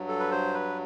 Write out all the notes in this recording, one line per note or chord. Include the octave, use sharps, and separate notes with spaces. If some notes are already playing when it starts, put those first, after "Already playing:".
Already playing: G2 F#3
A4
B4
C5
B4